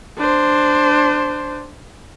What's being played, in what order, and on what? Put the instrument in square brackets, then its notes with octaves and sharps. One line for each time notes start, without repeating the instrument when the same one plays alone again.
[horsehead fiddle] D4 C5